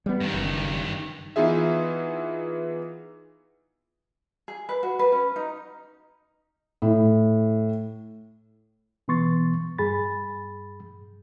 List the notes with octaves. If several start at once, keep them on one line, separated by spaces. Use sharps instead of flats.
G3 B3
G2 D#3
F#1
E3 B3 D#4 F4 G#4 E5
G#4
B4
F#4
B4
C#4
D#4
A2
B2 E3 B3 C6 C#6 A6
G2 G#4 B5 A6